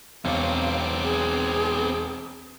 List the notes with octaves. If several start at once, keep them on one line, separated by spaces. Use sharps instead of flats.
E1 B3 C4 C#5 F5 D6
G#4